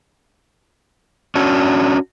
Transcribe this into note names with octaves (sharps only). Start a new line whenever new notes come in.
C#4 D4 F#4